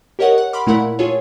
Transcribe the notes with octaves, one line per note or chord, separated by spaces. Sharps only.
G4 A#4 C#5 D#5 F#5
F#5
B5 C6 D6 F6
A#2 A3 E4 A#4 F#5 B5
F4 G#4 A4 C#5